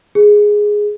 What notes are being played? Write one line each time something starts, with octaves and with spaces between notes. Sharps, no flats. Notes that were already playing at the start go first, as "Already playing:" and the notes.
G#4